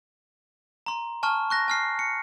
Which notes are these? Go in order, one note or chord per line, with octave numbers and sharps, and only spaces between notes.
A#5 C6
G#5 A5 C#6 F6
C#6 F#6 A#6
G#5 F6 C7
C#7